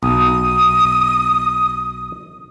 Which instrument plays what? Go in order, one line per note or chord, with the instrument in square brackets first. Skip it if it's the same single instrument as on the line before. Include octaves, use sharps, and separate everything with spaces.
[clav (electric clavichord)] B1 [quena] D#6